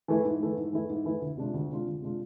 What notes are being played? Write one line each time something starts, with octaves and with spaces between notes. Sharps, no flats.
E3 A3 E4
G#2
E3 A3 E4
G#2
E3 A3 E4
G#2
E3 A3 E4
D2
C3 G#3 D4 F4
D2
C3 G#3 D4 F4
D2
C3 G#3 D4 F4